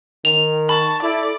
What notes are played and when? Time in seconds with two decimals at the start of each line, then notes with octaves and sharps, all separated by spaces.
0.25 D#3 F7
0.69 A5 B5 C#6
1.03 E4 A4 D5